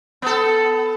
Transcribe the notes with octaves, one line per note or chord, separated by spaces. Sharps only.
B3 A4